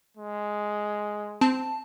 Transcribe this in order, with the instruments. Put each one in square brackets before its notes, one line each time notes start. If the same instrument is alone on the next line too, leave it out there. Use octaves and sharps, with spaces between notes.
[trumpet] G#3
[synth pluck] C4 [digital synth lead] A5